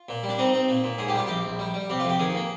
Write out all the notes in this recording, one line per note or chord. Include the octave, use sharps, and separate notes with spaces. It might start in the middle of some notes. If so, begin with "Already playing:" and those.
Already playing: F4
A#2
G3
D4
C4 D#4
C4
A#2
A#2
G#2 G#4
G4
G3 F4
A#1 G4
A#1
G3
G3
C3 G4
F4
F2 G4
D#3 G#4
A#3